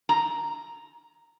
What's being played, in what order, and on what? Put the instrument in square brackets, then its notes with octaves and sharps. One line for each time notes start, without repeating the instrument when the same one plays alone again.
[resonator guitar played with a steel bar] A#5